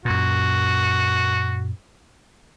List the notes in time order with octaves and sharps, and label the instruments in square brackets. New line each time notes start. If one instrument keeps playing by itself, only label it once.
[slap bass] F#2 A#2 [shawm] F#4